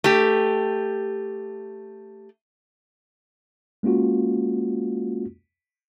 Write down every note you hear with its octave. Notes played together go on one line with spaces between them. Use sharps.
A3 G4
G#3 A#3 C#4 F4 F#4